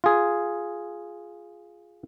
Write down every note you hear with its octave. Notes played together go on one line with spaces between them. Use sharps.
F4 G#4